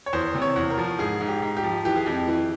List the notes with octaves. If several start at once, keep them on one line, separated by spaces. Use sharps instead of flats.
C#5
E2 C5
C3
C#5
E2
A#4
F3
G#2 G#4
G#2
G4
G#2
G4
F3
E3 G4
G#4
F2 G4
E3